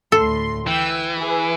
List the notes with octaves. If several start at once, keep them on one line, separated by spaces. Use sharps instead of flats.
D2 A2 A4 C6
E3 G5 E6
E4 G#4 B4